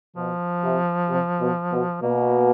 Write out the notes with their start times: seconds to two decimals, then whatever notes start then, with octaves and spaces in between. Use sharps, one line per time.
0.16 B2 F3
0.62 C3
1.09 C3
1.40 B2
1.71 B2
2.02 B2 A#3